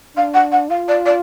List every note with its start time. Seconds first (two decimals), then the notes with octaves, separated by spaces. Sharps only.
0.17 D4 F5
0.34 F#5
0.52 F#5
0.70 F4 F5
0.88 D5
1.06 D5